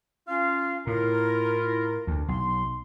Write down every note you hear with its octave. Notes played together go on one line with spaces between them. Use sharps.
C#4 F4 F5
A2 E4 F4 A#4
D2
B1 C6